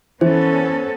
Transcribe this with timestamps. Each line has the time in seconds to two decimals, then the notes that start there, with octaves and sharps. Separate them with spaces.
0.21 E3 B3 C#4 A4 C5